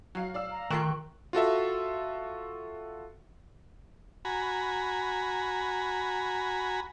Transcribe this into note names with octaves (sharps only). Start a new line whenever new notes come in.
F#3 F#4 F5
D5 F5 E6
A#5
D#3 A3 F4 G5 C#6 F#6 C7
F4 F#4 A4 E5
F#4 G#5 A#5 B5